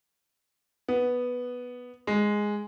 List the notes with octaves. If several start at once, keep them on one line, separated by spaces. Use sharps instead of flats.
B3
G#3